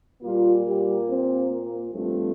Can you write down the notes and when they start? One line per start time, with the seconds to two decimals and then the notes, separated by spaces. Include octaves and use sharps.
0.22 A#2 G3 A#3 F4
0.65 G3 G4
1.07 C4 C5
1.50 A#3 A#4
1.93 G2 F3 A3 C4 F4